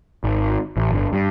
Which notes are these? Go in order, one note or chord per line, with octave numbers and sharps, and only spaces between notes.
G#1
A1
G1
G2